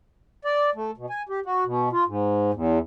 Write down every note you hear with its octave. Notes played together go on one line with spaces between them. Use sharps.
D5
A3
B2
G#5
G4
F#4
B2
F4
G#2
E2